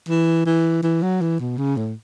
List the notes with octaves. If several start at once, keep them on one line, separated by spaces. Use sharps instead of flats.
E3
E3
E3
F#3
E3
B2
C#3
A2